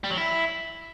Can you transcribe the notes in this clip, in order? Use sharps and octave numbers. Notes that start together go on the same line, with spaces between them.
G3
F#3
E4